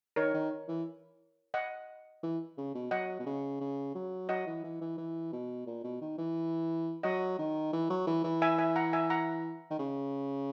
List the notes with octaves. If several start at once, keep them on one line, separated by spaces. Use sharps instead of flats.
D#3 A#4 C#5
D#3
E3
D#5 F#5
E3
C#3
B2
F#3 D#5 F#5
B2
C#3
C#3
F#3
F#3 D#5 F#5
E3
E3
E3
E3
B2
A#2
B2
D#3
E3
F#3 D#5 F#5
D#3
E3
F#3
E3
E3
E5 G#5
E5 G#5
F#5 A#5
E5 G#5
F#5 A#5
D#3
C#3